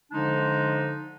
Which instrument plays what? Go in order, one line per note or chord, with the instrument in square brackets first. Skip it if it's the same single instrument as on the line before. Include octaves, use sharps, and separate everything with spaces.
[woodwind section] D3 F3 G#3 D4 D#4